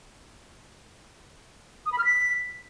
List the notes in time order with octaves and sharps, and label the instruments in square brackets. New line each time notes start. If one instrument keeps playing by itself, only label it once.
[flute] D#6
B5
F6
B6